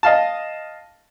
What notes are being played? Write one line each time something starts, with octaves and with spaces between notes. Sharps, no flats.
D#5 F5 A5